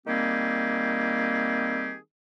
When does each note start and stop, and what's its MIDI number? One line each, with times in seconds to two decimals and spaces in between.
0.07 1.97 51
0.07 1.97 55
0.07 1.97 58
0.07 1.97 60
0.07 1.97 67
0.07 1.97 68